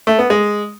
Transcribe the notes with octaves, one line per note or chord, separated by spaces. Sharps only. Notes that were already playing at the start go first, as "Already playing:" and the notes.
A3
B3
G#3